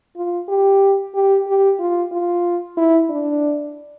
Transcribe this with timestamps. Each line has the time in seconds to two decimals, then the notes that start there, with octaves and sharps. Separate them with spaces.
0.16 F4
0.48 G4
1.15 G4
1.47 G4
1.79 F4
2.12 F4
2.77 E4
3.10 D4